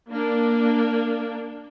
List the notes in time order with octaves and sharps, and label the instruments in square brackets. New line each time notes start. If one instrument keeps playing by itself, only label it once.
[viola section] A#3 D4